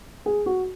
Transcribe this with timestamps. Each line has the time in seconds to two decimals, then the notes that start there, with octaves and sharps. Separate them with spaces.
0.26 G#4
0.46 F#4